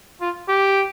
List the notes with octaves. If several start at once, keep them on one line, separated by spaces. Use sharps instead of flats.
F4
G4